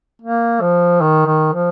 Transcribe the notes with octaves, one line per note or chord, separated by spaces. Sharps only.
A#3
F3
D#3
D#3
F3